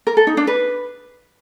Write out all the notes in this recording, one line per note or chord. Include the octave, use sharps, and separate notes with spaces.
A#4
A4
D#4
D4
B4